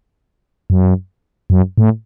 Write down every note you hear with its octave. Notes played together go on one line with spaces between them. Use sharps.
F#2
F#2
A2